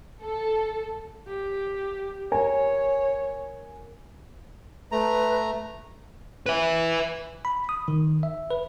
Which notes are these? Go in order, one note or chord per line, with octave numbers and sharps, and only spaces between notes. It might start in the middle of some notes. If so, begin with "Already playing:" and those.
A4
G4
A#4 C#5 G#5
A3 B4 A#5
B4 E5
B5
D#6
D#3
E5
B4